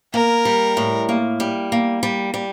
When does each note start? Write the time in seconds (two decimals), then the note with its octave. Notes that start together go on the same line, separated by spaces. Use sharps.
0.14 A#3 A#4
0.45 G3
0.77 A2
1.09 A#3
1.40 G3
1.72 A#3
2.03 G3
2.34 G3